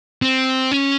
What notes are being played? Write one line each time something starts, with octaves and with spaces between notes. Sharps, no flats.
C4
C#4